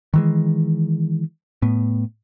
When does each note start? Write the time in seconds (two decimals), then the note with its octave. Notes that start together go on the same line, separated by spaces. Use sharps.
0.14 D#3 E3 G#3
1.62 A2 B3